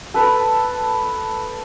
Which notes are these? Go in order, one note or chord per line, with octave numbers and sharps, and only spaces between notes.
A4 B4